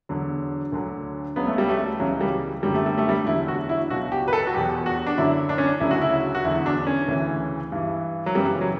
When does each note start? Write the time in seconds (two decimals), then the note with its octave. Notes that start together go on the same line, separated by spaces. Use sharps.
0.09 E2 D3 F#3
0.72 D2 D3 F#3
1.36 C#2 C#3 F#3 B3
1.47 A3
1.58 G3
1.69 A3
1.99 C#2 C#3 E3 F#3
2.21 G3
2.63 F#2 D3 F#3 G3
2.74 A3
2.86 G3
2.98 A3
3.09 G3
3.27 E2 D3 F#3 E4
3.48 F#4
3.69 E4
3.90 C#2 B2 F#3 F#4
4.12 G4
4.28 B4
4.33 A4
4.47 F#4
4.54 E2 B2 F#3 G4
4.86 F#4
5.07 D4
5.17 F#2 D3 F#3 E4
5.49 D4
5.58 C#4
5.67 D4
5.80 D2 C#3 F#3 E4
5.91 F#4
6.02 E4
6.35 F#4
6.44 E2 D3 F#3 E4
6.66 D4
6.87 C#4
7.08 D2 C#3 E3
7.72 G2 E3
8.26 F#3
8.35 F#2 C#3 E3 G3
8.61 F#3